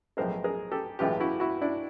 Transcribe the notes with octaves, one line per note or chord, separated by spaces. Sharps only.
B1 A2 F3 G#3 A#4 C5
G#4 A#4
G4 A4
B1 A2 E3 G#3 F4 G4
E4 F#4
E4 F#4
D4 E4